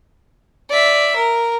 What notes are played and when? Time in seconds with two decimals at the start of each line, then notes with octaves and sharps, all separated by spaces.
0.70 D5 E5
1.15 A#4